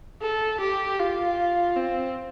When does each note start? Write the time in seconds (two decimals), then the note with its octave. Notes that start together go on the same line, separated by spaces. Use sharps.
0.21 A4
0.60 G4
0.99 F4
1.77 C4